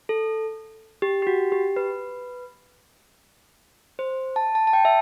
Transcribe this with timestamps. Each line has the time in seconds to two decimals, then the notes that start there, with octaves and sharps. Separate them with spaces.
0.09 A4
1.02 G4
1.22 G4
1.27 F#4
1.52 G4
1.76 B4
3.99 C5
4.36 A5
4.55 A5
4.67 A5
4.73 G5
4.85 E5